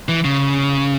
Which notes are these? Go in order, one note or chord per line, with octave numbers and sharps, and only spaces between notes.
E3
C#3